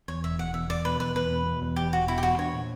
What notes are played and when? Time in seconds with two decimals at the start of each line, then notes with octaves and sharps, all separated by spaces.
0.08 E2 C#5
0.24 E1 E5
0.39 E1 F#5
0.54 E2 E5
0.69 E2 D5
0.85 B2 B4
1.00 E2 B4
1.15 E2 B4
1.30 B2
1.46 B2
1.62 E2
1.76 E1 G4
1.93 E1 F#4
2.07 B2 E4
2.18 G4
2.23 E2 F#4
2.38 D4 C#5
2.53 A#2